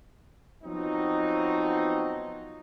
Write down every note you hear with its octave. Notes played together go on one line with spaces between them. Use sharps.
F3 F#3 B3 C4 D#4